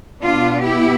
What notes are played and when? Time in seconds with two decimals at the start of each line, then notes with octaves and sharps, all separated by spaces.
0.22 B2 B3 D4 F4
0.63 E4 G4